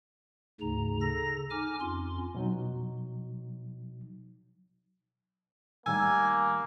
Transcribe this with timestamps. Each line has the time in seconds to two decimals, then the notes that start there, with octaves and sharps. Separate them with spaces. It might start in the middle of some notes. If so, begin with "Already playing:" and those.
0.61 D2 G#2 C#3 A#5
1.01 C#3 A4 A#5 A#6
1.50 D#4 G#5 D6 F6
1.81 F2 C#4 F4 C6
2.35 B2 F#3 D#4
5.86 A2 D#3 G3 A#3 G#5 E6